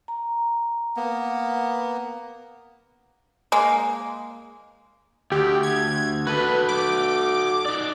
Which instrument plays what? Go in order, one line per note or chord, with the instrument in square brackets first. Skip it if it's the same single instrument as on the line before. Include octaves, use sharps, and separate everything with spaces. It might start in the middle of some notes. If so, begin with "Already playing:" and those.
[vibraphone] A#5
[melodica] A#3 B3
[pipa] G#3 A#3
[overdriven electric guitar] D2 [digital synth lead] G4
[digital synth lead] G#6
[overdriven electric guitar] F#4 A4 [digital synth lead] B4
[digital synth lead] D6
[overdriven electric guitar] D#4 D5